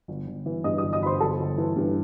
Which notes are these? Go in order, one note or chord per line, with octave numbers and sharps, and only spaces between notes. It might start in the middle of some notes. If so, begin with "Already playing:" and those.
G1
G1
E3
G2 D#5 D#6
G1 D#5 D#6
D#5 D#6
G1 C5 B5 C6
G1 A4 A5
G1
E3
G2